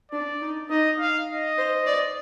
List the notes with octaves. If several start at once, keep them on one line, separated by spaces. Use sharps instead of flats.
D4 D5
D#4
D#4 D#5
F5
D#5
C5
D5